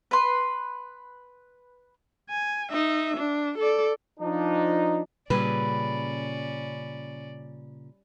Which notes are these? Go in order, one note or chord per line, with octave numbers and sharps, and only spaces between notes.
B4 C6
G#5
D#4 E5
D4
A4 D5
F3 D4 D#4
A#2 C#3 G3 C#4 G#4 B4 D5 E6